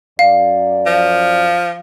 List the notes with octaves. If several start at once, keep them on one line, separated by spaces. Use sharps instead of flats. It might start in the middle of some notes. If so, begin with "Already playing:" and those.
F#2 D5 F5
F3